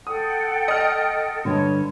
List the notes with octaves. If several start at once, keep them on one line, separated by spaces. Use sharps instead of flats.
A4 F#5 G5 D#6
D#5 F6
G2 D3 C#5